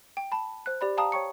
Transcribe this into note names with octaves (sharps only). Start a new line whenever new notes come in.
G5
A5 B5
C5 F#6
G4 D5 B5
F5 G5 A5 A#5 D#6
C#5 G5 C#6 C#7